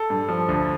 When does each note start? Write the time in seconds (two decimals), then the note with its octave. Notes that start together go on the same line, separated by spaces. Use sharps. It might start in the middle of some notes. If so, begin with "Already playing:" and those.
Already playing: A4
0.10 G2
0.29 F3
0.49 D2